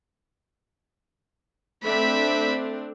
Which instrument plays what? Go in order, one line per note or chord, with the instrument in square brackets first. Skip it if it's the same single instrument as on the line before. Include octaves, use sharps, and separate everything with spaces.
[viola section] A3 C4 D4 [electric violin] E5 B5